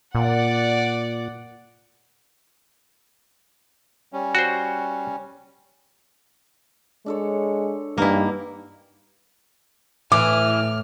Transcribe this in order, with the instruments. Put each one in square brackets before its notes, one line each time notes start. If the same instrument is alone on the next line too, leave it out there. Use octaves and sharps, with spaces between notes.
[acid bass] A#2 [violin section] D5 F#5
[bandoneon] G3 C#4
[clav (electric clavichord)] F#4 C5
[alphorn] G#3 [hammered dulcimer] D4 A4 C#5
[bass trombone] G2 [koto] A#3 E4 [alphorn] D#4 [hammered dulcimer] D5 F#5 G#5
[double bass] A2 [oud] E3 [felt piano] D6 [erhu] F6